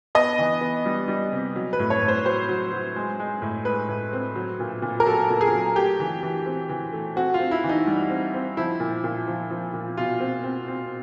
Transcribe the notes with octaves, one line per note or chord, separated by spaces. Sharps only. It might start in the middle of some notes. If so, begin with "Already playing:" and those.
B3 D#5
E3
B3
G3
G3
C3
F#3
B4
A2
C#5
A2
C5
F#3 C5
F#3
F#3
G#3
G#3
A2
G#3 B4
A2
C4
F#3
A#2
A#2
A#4
F#3 A4
A#2
G#4
F#3
A3 G4
E3
E3
C4
E3
A3
C4 F#4
F4
C4
E4
E3
D#4
G3
C4
C4
F3 E4
A#2
A#2
F3
F3
A#2
B2 F4
C4
C4
C4